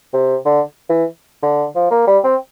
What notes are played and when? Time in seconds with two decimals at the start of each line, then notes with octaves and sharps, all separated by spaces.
0.14 C3
0.46 D3
0.89 E3
1.43 D3
1.75 F3
1.91 A#3
2.07 G3
2.24 C4